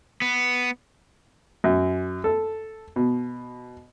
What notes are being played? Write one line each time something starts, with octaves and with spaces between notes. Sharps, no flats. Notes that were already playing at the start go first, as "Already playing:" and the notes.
B3
F#2
A4
B2